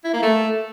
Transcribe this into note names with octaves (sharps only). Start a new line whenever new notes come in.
E4
A#3
A3